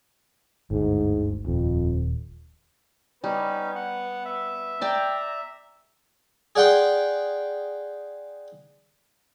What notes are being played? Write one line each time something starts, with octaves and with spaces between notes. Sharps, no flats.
G1 D2 G#2
D#1 F2
G3 B3 C#4 D#4
F#5
E5
D5 G5 A#5
G#4 D5 F#5 G5 C6